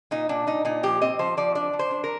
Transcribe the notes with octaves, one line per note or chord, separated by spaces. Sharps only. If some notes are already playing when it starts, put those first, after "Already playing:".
A#2 D#4
A#2 D4
A#2 D#4
A#2 D#4
F3 G4
C4 D#5
F3 C5
F3 D5
D4 D5
F3
C5
D4
A#4